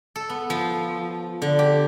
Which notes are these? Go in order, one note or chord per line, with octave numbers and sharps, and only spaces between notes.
A4
B3
F3
D3
G4